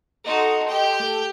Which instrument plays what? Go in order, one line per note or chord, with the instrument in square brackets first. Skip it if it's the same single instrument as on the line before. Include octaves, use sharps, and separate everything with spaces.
[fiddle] D#4 F#4 [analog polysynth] A4 D#5 C6
[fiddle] G4 G5
[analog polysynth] A3 A4